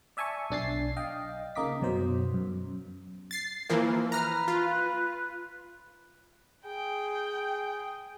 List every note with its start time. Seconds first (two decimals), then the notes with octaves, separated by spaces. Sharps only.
0.17 D5 E5 G#5 A5 C#6
0.50 B1 D4 A6 C7
0.97 D#5 F5 G5
1.55 C#3 A#3 D#4 D#5 D6 B6
1.82 F#2 B2 F#3 C5
2.34 F#2
3.31 A6 C7
3.70 E3 F3 A#3
4.12 B4 A#5 F6
4.48 F4
6.66 G#4 G5